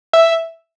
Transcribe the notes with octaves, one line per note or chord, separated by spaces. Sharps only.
E5